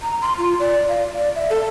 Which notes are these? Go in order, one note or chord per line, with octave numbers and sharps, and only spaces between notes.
A#5
C6
F4
D5
F5
D5
E5
A4